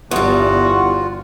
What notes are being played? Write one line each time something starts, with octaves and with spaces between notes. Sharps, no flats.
G1 E2 G3 F4 F#4